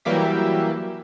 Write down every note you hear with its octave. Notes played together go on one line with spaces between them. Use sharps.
E3 F#3 G3 A#3 G4 E5